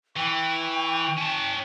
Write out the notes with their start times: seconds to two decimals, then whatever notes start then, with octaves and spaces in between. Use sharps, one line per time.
0.16 E3 G5 C#6
1.18 C#4 A5